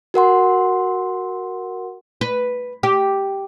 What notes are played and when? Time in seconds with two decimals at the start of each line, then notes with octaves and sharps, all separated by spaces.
0.14 F#4 A#4 F#5 C6
2.21 B4
2.83 G4